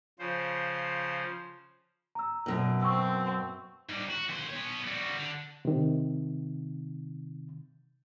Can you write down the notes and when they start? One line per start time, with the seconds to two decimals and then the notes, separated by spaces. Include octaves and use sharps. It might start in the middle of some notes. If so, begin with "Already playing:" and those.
0.19 C#3 F3 C5
2.15 A#5 E6
2.46 F#2 B2
2.82 C4 C#6 E6
3.89 G#2 G3
4.11 F#4
4.29 D#2 C5
4.50 B3 C#5
4.87 G3 F#4
5.17 D3
5.65 C3 D#3